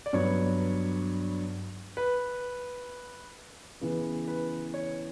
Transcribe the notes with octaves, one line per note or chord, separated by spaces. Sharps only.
D5
G2 F#3 B3 C#5
B4
C#3 E3 B3 B4
B4
C#5